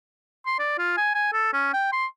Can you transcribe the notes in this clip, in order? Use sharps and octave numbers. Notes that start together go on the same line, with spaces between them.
C6
D5
F4
G#5
G#5
A4
C#4
G5
C6